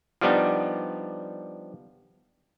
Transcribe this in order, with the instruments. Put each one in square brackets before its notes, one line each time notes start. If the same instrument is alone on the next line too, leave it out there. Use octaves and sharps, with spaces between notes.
[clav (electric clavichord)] F3 G3 B3 D4 D#4